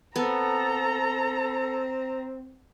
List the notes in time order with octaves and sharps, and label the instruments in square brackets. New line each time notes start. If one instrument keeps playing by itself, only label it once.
[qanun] B3 [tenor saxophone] C4 [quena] A4 [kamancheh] A#5